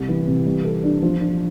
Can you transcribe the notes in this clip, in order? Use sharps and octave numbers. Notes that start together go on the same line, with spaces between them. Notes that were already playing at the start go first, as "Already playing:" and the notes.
Already playing: C2
E3
C3
G3
A4
D4
F3
D4